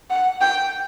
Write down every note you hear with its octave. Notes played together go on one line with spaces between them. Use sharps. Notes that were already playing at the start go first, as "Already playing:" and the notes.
F#5
G5